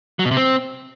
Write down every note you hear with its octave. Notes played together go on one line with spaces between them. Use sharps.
F#3
B2
C3
C4